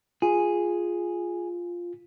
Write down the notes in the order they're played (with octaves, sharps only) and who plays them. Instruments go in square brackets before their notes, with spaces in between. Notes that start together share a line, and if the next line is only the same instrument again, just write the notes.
[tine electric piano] F4 [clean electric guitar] G#4